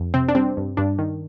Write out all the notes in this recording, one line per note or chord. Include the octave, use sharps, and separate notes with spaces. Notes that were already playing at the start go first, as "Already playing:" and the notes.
Already playing: F2
C3 C4
D4
G3 C4
G2
G2 D4
D#3